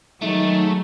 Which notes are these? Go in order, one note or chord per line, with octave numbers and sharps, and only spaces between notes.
D#3 F#3 G#3 A3 D#4